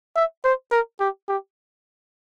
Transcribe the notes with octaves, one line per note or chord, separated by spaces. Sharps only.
E5
C5
A#4
G4
G4